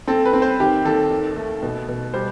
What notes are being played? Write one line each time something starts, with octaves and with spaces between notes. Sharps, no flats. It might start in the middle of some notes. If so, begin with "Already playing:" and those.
C4 A4
B4
C4
C5
D#3 G4
D#2 A4
D#3
A3
B2
B2
G3 C5